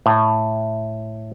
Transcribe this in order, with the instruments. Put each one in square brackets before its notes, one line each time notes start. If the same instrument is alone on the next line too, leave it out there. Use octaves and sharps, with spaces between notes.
[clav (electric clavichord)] A2